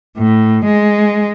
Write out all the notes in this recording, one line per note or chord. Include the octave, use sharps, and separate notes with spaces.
A2
G#3